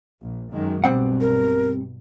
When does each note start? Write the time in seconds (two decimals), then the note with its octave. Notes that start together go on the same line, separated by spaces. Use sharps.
0.21 A#1
0.52 F#2 D#3 G#3
0.84 B1 G2 B2 G3 C4 F#5
1.21 A#4